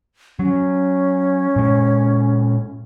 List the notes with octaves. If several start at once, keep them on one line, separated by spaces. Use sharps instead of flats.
F#3 C#4
A#2 G#3